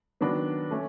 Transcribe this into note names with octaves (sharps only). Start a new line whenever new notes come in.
D#3 F#3 B3 D4
A3 C#4